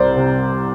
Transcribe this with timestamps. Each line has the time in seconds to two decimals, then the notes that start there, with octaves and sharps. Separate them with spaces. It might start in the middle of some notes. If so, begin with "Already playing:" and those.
Already playing: C2 C5 D5
0.16 C3